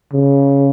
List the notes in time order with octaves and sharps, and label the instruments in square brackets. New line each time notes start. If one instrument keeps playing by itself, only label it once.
[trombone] C#3